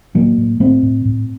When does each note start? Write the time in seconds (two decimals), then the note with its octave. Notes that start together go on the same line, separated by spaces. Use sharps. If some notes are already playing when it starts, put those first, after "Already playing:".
0.14 A2 F#3 A#3
0.38 A2
0.60 A2 A3 C4
0.83 A2
1.05 A2